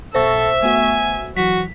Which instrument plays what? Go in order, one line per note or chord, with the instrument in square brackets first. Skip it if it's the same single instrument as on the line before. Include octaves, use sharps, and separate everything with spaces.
[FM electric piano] B1 B2 A#6 [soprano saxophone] A4 [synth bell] C5 C#6 [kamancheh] E5
[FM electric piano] A3 B3 F#4 [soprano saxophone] G#5
[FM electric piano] E3 F#3 [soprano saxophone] F#4 [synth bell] B6